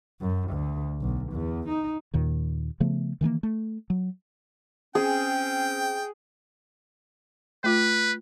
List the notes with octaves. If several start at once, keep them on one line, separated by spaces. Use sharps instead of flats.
F#2
D2
B1
E2
D#4
D#2 A#2 D#3
C#3 F3 A3 B3
D#3 E3 G#3 A#3
A3
F#3
C4 C#4 G#4 G5
A3 F4 B4